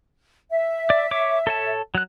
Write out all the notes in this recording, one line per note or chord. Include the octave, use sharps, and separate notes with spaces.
E5
D5
C#5 D6
A4 C#5 A5
F#3 F#6